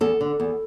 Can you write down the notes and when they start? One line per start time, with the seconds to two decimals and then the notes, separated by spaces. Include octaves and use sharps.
0.01 E2 A4
0.21 D3
0.40 E2